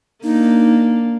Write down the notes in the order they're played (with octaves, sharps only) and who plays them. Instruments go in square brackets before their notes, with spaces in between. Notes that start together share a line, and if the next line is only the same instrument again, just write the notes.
[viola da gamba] A#3 D4 [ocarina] D#4